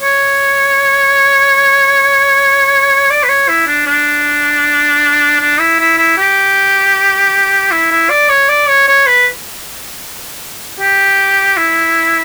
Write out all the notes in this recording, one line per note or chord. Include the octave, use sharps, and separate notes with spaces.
C#5
D5
B4
C#5
E4
D4
D4
D4
E4
E4
E4
G4
E4
E4
D5
C#5
D5
C#5
C#5
B4
G4
E4